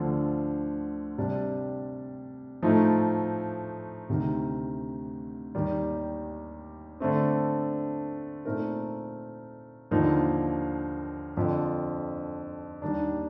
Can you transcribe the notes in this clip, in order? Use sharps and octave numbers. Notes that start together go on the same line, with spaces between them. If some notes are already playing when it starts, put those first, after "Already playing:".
Already playing: D2 D3 F3
C3 G3 D4
A2 F3 A3 D#4
D2 C3 D#3
D#2 D#3 G3
D3 A3 C4
A#2 A3 C4 D#4 A#4
D#2 D3 F3 A#3 D#4
F2 D3 F3
D#2 D#3 G3 D4